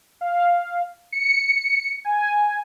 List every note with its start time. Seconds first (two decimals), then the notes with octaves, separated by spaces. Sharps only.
0.21 F5
1.12 C#7
2.05 G#5